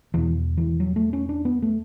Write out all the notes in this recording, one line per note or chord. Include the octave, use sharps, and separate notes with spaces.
E2 B2 E3
E3
F#3
A3
C#4
D4
B3
A3